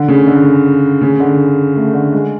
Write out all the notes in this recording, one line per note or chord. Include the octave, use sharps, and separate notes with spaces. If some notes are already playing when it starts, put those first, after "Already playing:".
Already playing: D3
C#3
D3
C#3
D3
A3
D3
G#3